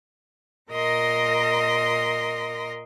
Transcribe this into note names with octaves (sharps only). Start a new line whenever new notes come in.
A#2 A#4 D#5 C6 A#6